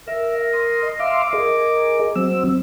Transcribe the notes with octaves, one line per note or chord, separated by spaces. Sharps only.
A#4 E5
C6 D#6
D#5
E5 F5 C6 D6
G#4 A#4 D#5
F#3 C4 E6